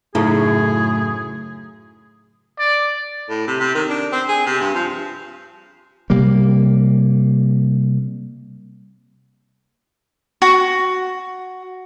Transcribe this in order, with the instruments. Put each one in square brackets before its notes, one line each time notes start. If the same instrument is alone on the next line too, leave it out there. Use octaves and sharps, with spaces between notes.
[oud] F#2 C#3 [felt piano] A2 [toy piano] D#4 E4 A4 [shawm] G#4
[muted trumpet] D5
[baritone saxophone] A2
C3
C3
D#3
D4
C4
G#4
C3
G2
F3
[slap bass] C3 G3 A#3
[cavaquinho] F#4